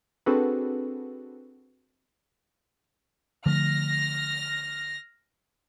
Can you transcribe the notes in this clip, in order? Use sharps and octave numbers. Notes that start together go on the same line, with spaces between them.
C4 D4 F#4 G#4 A4 B4
D3 F3 A3 F6 A#6